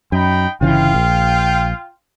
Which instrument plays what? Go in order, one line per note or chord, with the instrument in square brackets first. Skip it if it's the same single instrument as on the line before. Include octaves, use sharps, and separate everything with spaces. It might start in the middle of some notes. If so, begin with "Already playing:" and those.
[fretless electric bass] F#2 [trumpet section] D#4 G5 B5
[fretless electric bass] G1 C#3 E3 [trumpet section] F4 F5 G5
[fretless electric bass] A#1